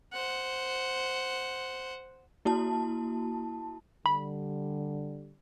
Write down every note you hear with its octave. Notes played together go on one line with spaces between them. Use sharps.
C5 F#5
A#3 E4 F#4 A5
D3 G3 B5